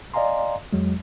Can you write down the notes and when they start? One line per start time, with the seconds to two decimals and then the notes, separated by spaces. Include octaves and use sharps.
0.14 D5 D#5 F5 G#5 A#5 C6
0.73 F2 F#3 G#3